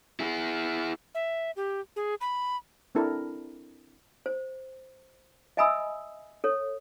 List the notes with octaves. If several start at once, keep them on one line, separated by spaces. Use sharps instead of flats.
E4 G#4
E5
G4
G#4
B5
C4 D4 E4 A4 A#4
C5
D#5 E5 G#5 B5 D#6 E6
A4 C#5